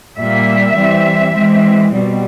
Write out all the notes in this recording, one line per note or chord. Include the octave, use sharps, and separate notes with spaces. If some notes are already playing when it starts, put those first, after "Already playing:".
A#2 G3 A#3 E5
E3 G3 C4
E3 G#3 C4
B2 G3 C4